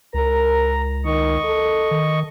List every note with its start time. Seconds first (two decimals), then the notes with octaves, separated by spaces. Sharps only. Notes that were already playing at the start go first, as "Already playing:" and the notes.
0.14 C#2 A#4 A#5
1.05 D#3 D#5 C#6
1.45 A4
1.91 D#3